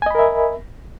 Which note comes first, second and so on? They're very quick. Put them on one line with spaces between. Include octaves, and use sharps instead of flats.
G#5 D#5 B5 A#4 E5